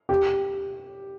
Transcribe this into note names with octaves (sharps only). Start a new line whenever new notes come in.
G4